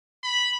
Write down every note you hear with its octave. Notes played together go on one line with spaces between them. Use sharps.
B5